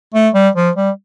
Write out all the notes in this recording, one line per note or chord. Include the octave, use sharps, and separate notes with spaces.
A3
G3
F3
G3